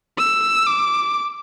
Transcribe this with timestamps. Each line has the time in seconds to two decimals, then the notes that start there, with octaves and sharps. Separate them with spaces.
0.18 E6
0.67 D6